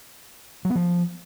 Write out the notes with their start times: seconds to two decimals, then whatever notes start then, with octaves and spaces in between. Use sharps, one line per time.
0.65 F#3
0.70 B3
0.75 F3